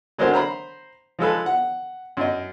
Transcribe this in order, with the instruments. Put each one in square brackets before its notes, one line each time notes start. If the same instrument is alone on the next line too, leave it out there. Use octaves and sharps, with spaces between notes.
[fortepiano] D3 F#3 G#3 C4 A#4 C5
C5 A#5 B5
F3 G#3 A4 B4
F#5
F#2 D#5